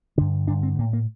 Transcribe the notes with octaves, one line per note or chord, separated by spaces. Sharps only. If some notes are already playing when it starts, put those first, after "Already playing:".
G2 D3 D4
G2 D3 D4
C4
A2 A#3
A#3